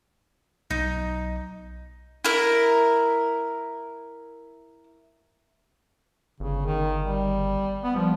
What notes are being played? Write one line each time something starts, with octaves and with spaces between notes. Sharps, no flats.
B1 D#4
E4 A#4
G1 C#3
D#3
G3
B3
F3 G3